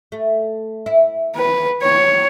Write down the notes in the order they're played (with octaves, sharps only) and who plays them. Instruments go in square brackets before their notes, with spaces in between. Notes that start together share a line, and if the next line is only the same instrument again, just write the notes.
[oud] A3
E4
[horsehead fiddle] B4
C#5